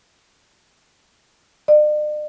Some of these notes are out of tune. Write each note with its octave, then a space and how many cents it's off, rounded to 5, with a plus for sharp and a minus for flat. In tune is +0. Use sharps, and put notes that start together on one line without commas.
D5 +45